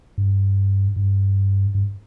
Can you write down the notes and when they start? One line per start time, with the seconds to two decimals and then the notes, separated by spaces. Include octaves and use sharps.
0.18 G2
0.96 G2
1.75 G2